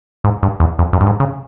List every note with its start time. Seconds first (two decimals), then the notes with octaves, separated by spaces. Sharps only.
0.24 G#2
0.43 G2
0.60 E2
0.79 F2
0.93 F#2
1.01 G2
1.06 G#2
1.20 C#3